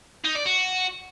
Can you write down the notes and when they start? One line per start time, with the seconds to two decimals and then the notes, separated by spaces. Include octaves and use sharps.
0.24 D#4
0.35 D5
0.45 F#4